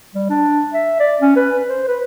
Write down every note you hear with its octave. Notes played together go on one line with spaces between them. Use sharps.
G3
D4
E5
D5
C#4
B4
C5
B4